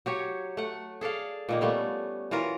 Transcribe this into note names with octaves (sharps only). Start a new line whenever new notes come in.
F#3 G4 C#5
A3 F#5
G#4 A4 D5 F5
A#2 D#3 A#3
G3 A3 B3 C#4
E3 F#3 F4 A#4